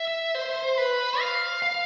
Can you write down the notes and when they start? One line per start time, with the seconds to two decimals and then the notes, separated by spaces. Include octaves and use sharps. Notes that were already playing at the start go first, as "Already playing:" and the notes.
Already playing: E5
0.35 C5
0.78 B4
1.20 F5
1.62 F5